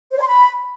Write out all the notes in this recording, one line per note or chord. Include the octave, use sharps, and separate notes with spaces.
C5
C#5
C6
B5